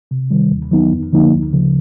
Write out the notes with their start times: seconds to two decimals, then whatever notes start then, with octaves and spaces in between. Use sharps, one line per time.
0.11 C3
0.31 D#3 G3
0.51 D#2
0.71 D#3 F#3 B3 D#4
0.92 F2
1.13 D3 F3 A#3 D#4
1.32 D2
1.53 C#3 F3